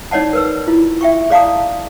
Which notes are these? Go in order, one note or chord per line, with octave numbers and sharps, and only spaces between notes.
D#4 C#5 D5 F#5 A5
A#4 B4 E6
E4 F4
E5 G5 C#6
G#4 D5 F5 A5 A#5 D#6